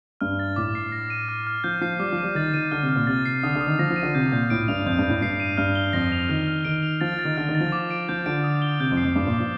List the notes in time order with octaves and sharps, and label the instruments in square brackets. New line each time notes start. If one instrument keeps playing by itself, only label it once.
[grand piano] G2 [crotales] F6
[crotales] A6
[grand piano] A2 [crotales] D6
[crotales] C7
A#6
D#7
F6
F6
[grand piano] F3 [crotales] G6
[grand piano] F3 [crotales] C7
[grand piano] G3 [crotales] D6
[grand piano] F3
[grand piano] G3 [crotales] D#7
[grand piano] D#3 [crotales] A6
[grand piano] D#3 [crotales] D#7
[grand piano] D3 [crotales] F6
[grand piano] C3
[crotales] F6
[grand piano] A#2
[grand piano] C3 [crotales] A6
[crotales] C7
[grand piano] D3 [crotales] D#6
[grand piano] D3
[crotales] D#6
[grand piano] D#3
[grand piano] F3 [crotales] A#6
[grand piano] F3
[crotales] D#7
[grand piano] D3
[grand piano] C3 [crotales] G6
[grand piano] A#2 [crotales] G6
[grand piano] A2 [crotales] D7
[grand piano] G2 [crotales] F7
[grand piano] F2 [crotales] G6
[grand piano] G2 [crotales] G6
[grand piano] A2
[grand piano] G2 [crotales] C7
[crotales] D#7
[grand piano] G2 [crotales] F6
[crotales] G7
[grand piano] F2 [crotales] A#6
[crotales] F7
[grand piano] D#3 [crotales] F6
[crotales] F6
[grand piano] D#3 [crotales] D7
[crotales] F7
[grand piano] F3 [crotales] A6
[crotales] A6
[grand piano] D#3
[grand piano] D3 [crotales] F6
[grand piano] D#3
[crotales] A6
[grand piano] F3
[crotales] D6
D7
[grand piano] F3 [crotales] G6
[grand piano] D3 [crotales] D7
[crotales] D#6
G7
[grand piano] C3 [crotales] G6
[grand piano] F2
[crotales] C7
[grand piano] F2
[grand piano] G2 [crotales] D6
[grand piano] A#2
[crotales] D6
[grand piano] F3